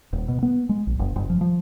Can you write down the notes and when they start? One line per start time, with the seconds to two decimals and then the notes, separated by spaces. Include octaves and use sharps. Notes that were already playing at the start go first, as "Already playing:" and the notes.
0.13 D#1
0.28 B2
0.43 B3
0.69 G#3
0.87 A#1
0.99 F#1
1.16 F#1
1.30 F3
1.41 F3